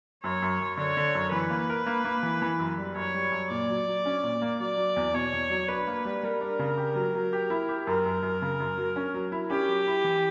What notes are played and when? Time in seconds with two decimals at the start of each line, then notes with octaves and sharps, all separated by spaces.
0.23 F#2 C#5
0.42 F#2
0.60 F#2
0.77 D3 C#5
0.97 D3
1.15 F#2
1.32 E3 B4
1.50 A#3
1.69 A#4
1.86 A#3
2.05 A#3
2.23 E3
2.42 E3
2.59 F#2
2.78 G3
2.95 F#2 C#5
3.14 G3
3.32 F#2
3.50 A#2 D5
3.69 F#3
3.87 F#3
4.05 C#4
4.23 A#2
4.42 A#3
4.60 F#3 D5
4.77 F#3
4.96 E2
5.14 B2 C#5
5.33 E2
5.50 F#3
5.68 D4 B4
5.87 A#3
6.05 G3
6.23 G3 A#4
6.41 D4
6.59 C#3
6.77 G4
6.95 F#3
7.15 F#3
7.33 G4
7.50 E4
7.69 G4
7.87 F#2 A#4
8.06 F#2
8.23 F#2
8.42 C#3
8.60 F#2
8.78 F#3
8.96 C#4
9.14 F#3
9.32 E4
9.50 C#4 G4
9.69 F#3
9.87 E4
10.04 E3